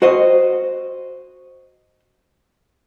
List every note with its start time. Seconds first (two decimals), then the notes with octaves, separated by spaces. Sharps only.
0.02 F#4 C5 D#5